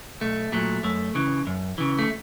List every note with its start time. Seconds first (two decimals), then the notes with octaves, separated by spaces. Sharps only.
0.21 B1 A3
0.52 A#2 F#3 A3
0.83 F#2 A3
1.15 C#3 E3
1.47 F#2
1.78 C#3 E3
1.99 A3